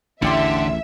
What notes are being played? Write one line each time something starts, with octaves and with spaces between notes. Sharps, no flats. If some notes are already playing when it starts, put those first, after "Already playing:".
A1 E2 A2 D3 D5 E5 G5 C6